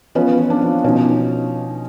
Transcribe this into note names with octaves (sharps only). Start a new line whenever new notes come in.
F3 B3 C#4
F3
C4 D4
F3
B2 C#4 D#4